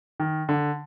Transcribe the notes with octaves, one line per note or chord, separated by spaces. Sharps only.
D#3
D3